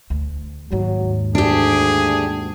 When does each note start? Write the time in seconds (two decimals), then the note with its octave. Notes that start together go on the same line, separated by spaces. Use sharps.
0.10 D2
0.72 D#2 G#2 F#3
1.35 D2 D4 G4 G#4